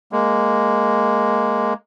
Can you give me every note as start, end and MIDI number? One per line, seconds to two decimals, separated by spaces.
0.12 1.73 56
0.12 1.73 58